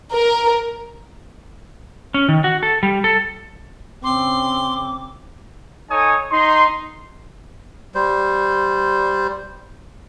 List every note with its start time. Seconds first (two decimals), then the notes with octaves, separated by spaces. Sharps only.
0.11 A#4
2.14 C#4
2.29 D#3
2.44 F#4
2.63 A4
2.83 G3
3.04 A4
4.04 C#3 C4 C6 D6
5.91 D#4 A4 C#5 G#5 D#6
6.32 D#4 C6
7.95 G3 C5